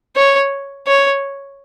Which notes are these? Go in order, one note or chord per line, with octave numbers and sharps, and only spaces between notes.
C#5
C#5